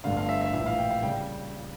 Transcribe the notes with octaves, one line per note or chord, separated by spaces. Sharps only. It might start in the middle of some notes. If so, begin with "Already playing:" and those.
G1 G2 D3 A3 F5
F5
E5
E5
A#1 A2 E3 E5
F5
G5
F5
C#3 G3 G5